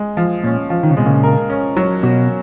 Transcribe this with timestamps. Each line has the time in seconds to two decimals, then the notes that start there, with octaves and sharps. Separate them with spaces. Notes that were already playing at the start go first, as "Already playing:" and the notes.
Already playing: G#3
0.17 F3
0.44 A#2 C#4
0.70 F3
0.83 D#3
0.91 C#3
0.97 B2 G#3
1.05 A#2 C#3
1.23 A#4
1.50 C#4
1.77 F#3
2.03 B2 F#4